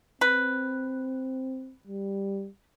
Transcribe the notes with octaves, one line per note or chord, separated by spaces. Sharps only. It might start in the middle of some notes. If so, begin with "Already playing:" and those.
C4 B4
G3